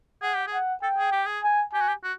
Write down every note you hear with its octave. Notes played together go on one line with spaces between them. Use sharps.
G#4 F#5
G4
G#4
F#5
A4 G5
G#4
G4
G#4
G#5
G4 G#5
F#4
G4
F#4